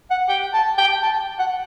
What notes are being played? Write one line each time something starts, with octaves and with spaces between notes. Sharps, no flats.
F#5
G5
A5
G5
A5
F#5